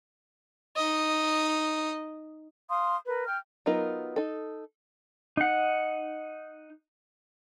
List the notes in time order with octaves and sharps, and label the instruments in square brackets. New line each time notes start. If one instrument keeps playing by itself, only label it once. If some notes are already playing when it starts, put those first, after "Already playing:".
[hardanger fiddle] D#4 D#5
[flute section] F5 C6 D#6
A#4 B4
G5 F6
[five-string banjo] F#3 B3 D#4 F4 A#4
D#4 A4
[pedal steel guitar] D#4 F#5